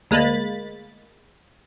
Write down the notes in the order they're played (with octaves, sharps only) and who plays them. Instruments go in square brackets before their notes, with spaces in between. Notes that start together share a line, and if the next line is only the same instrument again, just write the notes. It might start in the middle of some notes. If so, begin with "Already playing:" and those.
[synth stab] D2 G#3 A#3 B5 A6